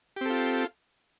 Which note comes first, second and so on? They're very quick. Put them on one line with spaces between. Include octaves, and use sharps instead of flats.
G4 C4 A4 F4